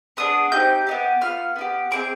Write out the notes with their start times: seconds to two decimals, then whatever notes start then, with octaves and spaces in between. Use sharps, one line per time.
0.17 B3 D4 G#4 D#6
0.52 C4 D#4 G4 G6
0.87 B3 D#4 G4
1.21 B3 F4 F6
1.56 B3 D#4 G4
1.91 C4 D#4 G#4 D6